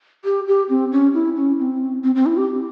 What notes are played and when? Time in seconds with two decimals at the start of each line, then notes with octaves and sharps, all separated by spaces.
0.25 G4
0.48 G4
0.69 C4
0.92 C#4
1.14 E4
1.36 C#4
1.59 C4
2.04 C4
2.15 C4
2.26 E4
2.37 G4